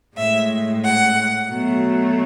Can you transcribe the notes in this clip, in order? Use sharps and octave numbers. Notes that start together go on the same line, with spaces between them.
A2 G#3 E5
F#5
B2 F#3 A3